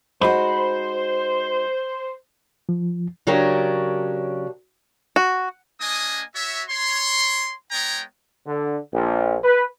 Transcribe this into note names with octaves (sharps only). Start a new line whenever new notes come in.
G#3 D#4 F#4 C5 B5
F3
C#3 F#3 C#4 D4 G4 A#4
F#4
A#3 D4 D#5 G#5 D#6
F#4 C#5 E5
C#5 C6
G#3 B3 C#5 G5 A#5
D3
A#1
B4